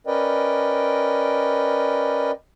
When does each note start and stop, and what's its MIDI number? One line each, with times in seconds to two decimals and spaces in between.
0.07 2.32 61
0.07 2.32 70
0.07 2.32 71
0.07 2.32 74
0.07 2.32 75
0.07 2.32 79